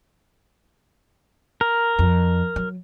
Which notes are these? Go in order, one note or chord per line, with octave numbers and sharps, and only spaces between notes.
A#4
F2
F#3